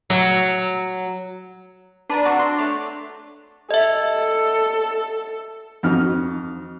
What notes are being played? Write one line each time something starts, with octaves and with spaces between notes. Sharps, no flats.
F#3
D4 B4 A#5
C4 F#4 C#6
C6
A3 C#5 D6
A4 D#5 E5
F2 D#4 F#4 F6